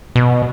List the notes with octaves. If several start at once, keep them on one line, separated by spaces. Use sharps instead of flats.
B2